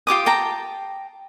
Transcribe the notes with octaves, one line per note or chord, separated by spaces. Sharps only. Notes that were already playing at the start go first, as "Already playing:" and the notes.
F4 G4 D6 D#6
G5 A5 A#5